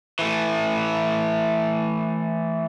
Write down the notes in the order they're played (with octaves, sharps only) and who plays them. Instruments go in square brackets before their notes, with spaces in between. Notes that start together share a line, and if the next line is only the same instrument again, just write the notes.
[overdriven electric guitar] E3 A3